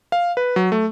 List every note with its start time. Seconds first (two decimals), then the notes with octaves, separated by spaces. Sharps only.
0.12 F5
0.37 B4
0.56 F#3
0.72 A3